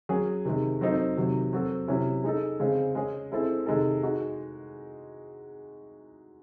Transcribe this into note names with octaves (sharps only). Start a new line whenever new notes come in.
F#3 C#4 G#4
C3 D#3 G#3
F#3 C4 D#4 A4
C3 D#3 F#3
F#3 C4 F#4 A4
C3 F#3 C#4 E4
G#3 D#4 A4
C#3 G#3 C4
G#3 C#4 G#4
G#3 C4 E4 A4
C3 D#3 G#3 D#4 A4
G#3 D#4 F#4